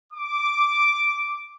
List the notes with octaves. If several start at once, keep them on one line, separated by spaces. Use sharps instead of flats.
D6